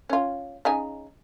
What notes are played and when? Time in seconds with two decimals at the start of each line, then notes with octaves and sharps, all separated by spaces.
0.10 C#4 F4
0.65 C#3 D#4 G#5